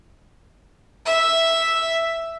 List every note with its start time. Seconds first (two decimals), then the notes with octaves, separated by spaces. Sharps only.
1.06 E5